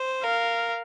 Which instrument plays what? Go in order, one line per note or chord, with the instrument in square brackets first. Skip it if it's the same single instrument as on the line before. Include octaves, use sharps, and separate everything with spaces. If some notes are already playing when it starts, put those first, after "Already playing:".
Already playing: [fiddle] C5
[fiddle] A#4 [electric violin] F5